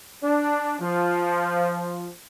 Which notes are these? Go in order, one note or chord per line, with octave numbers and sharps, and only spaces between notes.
D4
F3